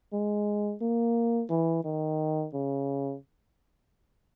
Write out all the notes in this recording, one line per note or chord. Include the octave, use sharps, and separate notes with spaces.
G#3
A#3
E3
D#3
C#3